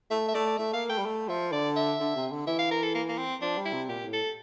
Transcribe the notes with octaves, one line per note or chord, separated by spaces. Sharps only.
A3 E5
E5
A3 D5
D5
A3 E5
A#3 F5
A3 G5
G3
A3
F3 E5
D3 D5
E5
D3
C3
D3
E3 E5
F5
A#4
A4
A#3
A#3
C4
F3 D4
G3
E4
C3
A#2 G4
A2
A4